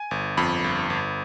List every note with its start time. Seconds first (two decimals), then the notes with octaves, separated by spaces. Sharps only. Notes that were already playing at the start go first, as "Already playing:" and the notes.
Already playing: G#5
0.11 G1
0.37 F2 B5
0.64 G1
0.90 G1